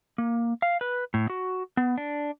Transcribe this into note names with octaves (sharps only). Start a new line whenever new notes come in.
A#3
F5
B4
A2
F#4
B3
D4